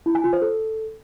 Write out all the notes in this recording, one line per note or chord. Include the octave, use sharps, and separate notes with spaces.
E4
G#5
F4
C5
A4